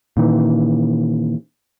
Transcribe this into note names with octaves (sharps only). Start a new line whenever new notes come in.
A#2 D#3 E3